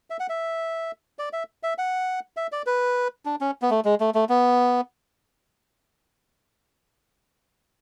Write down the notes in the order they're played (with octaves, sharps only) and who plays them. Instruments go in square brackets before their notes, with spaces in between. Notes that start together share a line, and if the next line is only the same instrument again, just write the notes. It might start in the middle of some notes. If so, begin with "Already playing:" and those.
[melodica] E5
F#5
E5
D5
E5
E5
F#5
E5
D5
B4
D4
C#4
B3
A3
G#3
A3
A3
B3